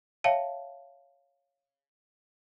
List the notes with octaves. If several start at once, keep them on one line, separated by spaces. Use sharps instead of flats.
C#5 E5 F5 G5 A5